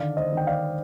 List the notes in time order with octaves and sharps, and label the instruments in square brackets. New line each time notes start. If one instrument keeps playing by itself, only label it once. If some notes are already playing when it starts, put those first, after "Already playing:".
Already playing: [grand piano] D3 D#3 D5 F5
C5 D#5
D#3
G5
D5 F5